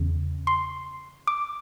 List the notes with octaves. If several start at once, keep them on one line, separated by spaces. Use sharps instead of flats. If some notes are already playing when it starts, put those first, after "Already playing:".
Already playing: E2 C#3
C6
D6